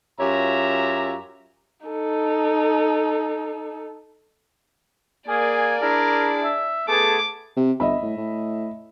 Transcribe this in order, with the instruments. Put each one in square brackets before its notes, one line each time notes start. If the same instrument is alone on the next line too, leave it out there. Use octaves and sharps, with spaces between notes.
[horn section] F#2 F4 G4 C#5 E5 A#5
[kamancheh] D#4 A4
[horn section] A#3 G#5 [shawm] G#4 [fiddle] D5
[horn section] D4 E4 G#4 [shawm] A#4
[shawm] E5
[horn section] A3 B3 G#4 [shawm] A5 [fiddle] D6
[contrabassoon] C3
[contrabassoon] G1 [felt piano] D#5 E5 B5
[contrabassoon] A2
A2